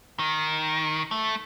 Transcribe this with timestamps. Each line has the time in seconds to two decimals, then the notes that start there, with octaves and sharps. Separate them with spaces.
0.19 D#3
1.11 A3